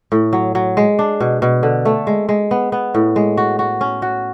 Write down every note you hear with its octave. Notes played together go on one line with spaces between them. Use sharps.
A2
F#3
F#3
G#3
D4
B2
B2
D3
A3
G#3
G#3
B3
B3
A2
G#3
F#4
F#4
C#4
F#4